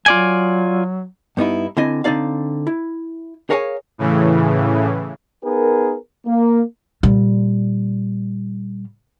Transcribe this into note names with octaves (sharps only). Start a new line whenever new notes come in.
F#3 F4 D5 G#5
G2 B3 D#4 E4
D3 C4 E4 D#5 G#5
D3 C4 D#4 D5 F5
E4
G#4 A#4 C#5 F5 G#5
A2 C#3 E3
B3 D#4 G#4 A#4
A#3
A#2 G3